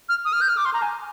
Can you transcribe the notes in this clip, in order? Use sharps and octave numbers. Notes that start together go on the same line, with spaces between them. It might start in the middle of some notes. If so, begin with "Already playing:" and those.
F6
D#6
F6
G6
F6
D6
C6
A#5
G#5